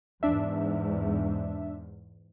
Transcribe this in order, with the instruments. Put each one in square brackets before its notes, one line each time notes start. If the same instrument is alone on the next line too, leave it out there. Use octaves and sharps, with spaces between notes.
[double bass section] E2 G#2 [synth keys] D4 E5